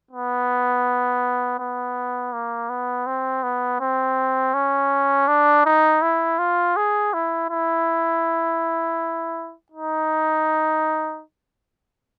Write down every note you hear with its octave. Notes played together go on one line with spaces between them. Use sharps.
B3
B3
A#3
B3
C4
B3
C4
C#4
D4
D#4
E4
F4
G#4
E4
E4
D#4